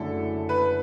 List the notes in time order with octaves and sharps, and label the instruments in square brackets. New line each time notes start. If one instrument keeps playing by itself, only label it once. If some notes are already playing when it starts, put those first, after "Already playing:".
Already playing: [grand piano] F#1 F#2 D3 A3 E4 [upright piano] A4
[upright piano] B4